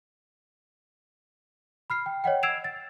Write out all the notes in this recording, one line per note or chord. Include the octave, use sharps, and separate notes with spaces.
B5 F6 C7
G5
C#5 D#5 F#5 G5
E6 G#6 C7 D7 E7 F7
A6